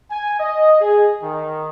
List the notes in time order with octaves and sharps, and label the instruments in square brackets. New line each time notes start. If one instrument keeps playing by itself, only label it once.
[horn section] G#5
D#5
G#4
D#3